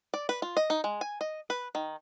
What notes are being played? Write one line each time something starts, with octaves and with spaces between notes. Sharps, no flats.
D5
B4
F4
D#5
D#4
G#3
G#5
D#5
B4
D#3